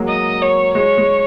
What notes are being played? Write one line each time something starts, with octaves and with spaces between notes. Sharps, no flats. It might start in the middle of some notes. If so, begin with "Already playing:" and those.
Already playing: F#3 G#3 A#3
D#5
C#5
G#3 C#5
G#3